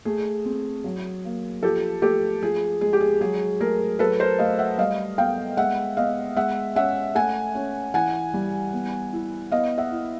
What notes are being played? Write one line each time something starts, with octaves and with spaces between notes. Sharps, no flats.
A3 G#4
C4
F#3
A#3
F3 G4 A4
A3 G4 A4
F3 G#4
G#3 G#4
G4
G#4
F#3 G#4
A3 G#4 A#4
F#3 A4 B4
A#4 C5
A3 D#5 F5
E5 F#5
G3 D#5 F5
B3 F5 G5
G#3 E5 F#5
B3 D#5 F5
G#3 E5 F#5
C#4 E5 F#5
A3 F#5 G#5
C#4
E3 F#5 G#5
G3
B3
E4
B3 D#5 F5
E5 F#5
E4